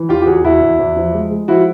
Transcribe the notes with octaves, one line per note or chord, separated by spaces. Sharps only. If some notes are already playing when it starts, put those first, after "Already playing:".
Already playing: E3
E2 F4 G4
G4
E2 F#4 G#4
E2 E4 F#4
E2
E2
F3
G#3
G#3
F3 E4 F#4